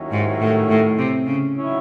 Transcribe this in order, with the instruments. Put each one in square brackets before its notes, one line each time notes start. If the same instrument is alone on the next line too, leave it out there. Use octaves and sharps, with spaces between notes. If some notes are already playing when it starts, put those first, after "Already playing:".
Already playing: [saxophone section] D#2 D#3 F#3 C#4 E4
[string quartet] G#2
A2
A2
C3
C#3
[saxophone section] D#3 F#3 C#4 E4